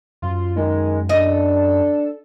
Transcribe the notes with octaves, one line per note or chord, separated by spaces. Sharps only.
F#2 F4
D#3 G#3
D4 A4 D#5